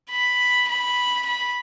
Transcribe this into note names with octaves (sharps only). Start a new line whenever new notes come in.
B5
B5
B5